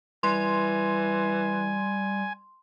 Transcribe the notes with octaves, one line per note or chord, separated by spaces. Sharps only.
E3 G3 G#5 C6